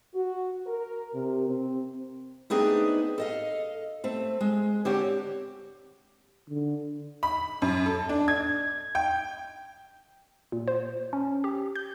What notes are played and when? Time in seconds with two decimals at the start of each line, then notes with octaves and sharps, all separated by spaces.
0.15 F#4
0.66 A#4
1.14 C3
1.49 C4
2.50 A3 B3 C4 D4 D#4 G#4
3.18 A4 D#5 F5
4.04 A3 C4
4.41 G#3
4.85 D3 C4 D4 F#4 G4 C#5
6.50 D3
7.23 B5
7.62 F#2
7.86 A4
8.09 D4
8.28 G#6
8.95 G5
10.52 A#2
10.68 C5
11.13 C#4
11.44 G4
11.75 G6